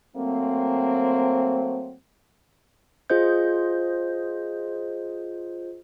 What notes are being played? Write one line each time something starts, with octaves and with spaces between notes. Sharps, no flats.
F#3 A3 A#3 C4
F4 G#4 C5 D#5 G6